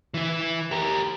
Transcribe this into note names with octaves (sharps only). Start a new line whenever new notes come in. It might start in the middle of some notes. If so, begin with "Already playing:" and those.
E3 E4
G4 A#4